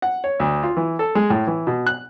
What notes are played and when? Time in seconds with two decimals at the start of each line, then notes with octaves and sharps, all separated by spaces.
0.02 F#5
0.24 C#5
0.40 D2
0.63 F4
0.77 E3
0.99 A4
1.15 G#3
1.30 A2
1.47 E3
1.67 B2
1.87 F#6